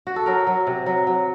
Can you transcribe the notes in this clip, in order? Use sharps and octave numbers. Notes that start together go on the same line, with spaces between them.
F#4
A4
F#3 A#4
F#3
C3
F#3
F#3